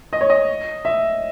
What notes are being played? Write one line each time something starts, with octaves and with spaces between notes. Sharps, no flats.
D#5
C#5
D#5
E5